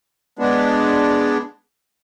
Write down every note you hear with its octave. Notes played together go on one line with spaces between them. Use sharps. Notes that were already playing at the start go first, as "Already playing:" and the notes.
G#3 B3 D4